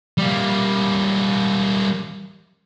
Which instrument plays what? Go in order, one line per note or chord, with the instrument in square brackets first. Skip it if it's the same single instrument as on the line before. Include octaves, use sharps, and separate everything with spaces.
[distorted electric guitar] G3 A#3